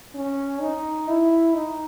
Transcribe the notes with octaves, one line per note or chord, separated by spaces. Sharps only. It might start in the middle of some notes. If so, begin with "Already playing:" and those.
C#4
D#4
E4
D#4